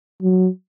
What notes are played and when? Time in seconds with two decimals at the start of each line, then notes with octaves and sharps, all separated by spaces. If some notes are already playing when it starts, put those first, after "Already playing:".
0.22 F#3